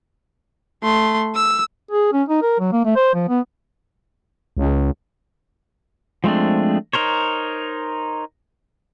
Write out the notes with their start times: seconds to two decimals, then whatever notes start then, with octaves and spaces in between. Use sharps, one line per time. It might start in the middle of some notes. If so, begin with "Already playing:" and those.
0.83 A3 C6
1.35 E6
1.91 G#4
2.13 C#4
2.28 D#4
2.42 A#4
2.59 F#3
2.72 A#3
2.85 A3
2.96 C5
3.14 F3
3.29 B3
4.57 C#2
6.24 F3 G#3 A3 C4 D4
6.93 D#4 A#4 C5 C#5